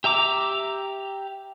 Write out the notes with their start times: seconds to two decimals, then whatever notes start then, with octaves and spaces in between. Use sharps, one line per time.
0.04 G4 E5 A#5 D6